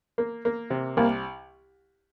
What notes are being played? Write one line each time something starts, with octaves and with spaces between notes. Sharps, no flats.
A#3
A#3
C3
C2 A#3